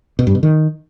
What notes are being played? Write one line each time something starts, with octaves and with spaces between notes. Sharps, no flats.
B2
G2
B2
D#3